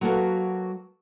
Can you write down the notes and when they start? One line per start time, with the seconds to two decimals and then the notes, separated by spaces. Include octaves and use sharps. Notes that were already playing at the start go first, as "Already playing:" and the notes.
0.01 F#3 A#3 F#4 A4 B4 F5